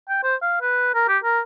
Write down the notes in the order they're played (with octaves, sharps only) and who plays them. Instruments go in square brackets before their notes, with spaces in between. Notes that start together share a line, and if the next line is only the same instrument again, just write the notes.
[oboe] G5
C5
F5
B4
A#4
G4
A#4